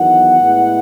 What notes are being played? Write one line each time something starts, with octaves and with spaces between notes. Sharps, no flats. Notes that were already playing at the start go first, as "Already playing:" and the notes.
Already playing: E2 D#3 F#3 B3 D#4 F#5
A2 G#3 B3 E4